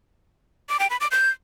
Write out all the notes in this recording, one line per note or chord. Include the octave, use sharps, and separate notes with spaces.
D6
G5
B5
D6
G6